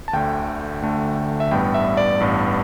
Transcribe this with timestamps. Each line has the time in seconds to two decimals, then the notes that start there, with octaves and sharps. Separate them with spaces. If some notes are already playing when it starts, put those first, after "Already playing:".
0.08 A5
0.13 D2 D3 A3 G5
0.82 D2 D3 A3
1.40 E5
1.51 A1 G2 G3 B3 G5
1.74 E5
1.97 D5
2.20 A1 G2 G3 B3